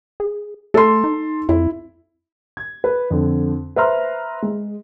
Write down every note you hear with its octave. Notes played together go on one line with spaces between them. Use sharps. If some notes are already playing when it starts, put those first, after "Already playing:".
G#4
A3 A4 C6
D#4
F2 E4
G#6
B4
F2 D3
B4 C5 E5 A#5 C6 F6
G#3